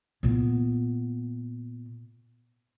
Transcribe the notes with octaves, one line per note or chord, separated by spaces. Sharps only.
A#2 B3